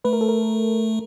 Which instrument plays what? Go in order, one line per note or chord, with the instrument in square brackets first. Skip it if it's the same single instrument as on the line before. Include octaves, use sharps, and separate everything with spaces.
[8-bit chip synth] A3 [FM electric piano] B4
[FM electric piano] A#4
A4
A#4